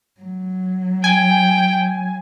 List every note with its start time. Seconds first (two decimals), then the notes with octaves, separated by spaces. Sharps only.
0.21 F#3
1.04 G5 G#5